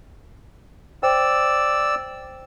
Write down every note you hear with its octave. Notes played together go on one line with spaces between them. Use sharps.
C5 D5 G5 E6